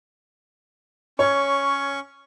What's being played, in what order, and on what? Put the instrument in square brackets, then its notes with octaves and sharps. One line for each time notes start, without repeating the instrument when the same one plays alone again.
[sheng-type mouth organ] C#4 C#6 [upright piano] C#5